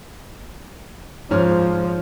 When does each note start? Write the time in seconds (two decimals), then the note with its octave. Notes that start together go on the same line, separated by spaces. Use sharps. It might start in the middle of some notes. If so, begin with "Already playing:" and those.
1.31 G#2 F3 C#4 F6